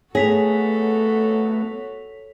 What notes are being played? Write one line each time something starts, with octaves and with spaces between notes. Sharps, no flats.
A3 B3 F#4 G#4 A4 C#5 B6 F7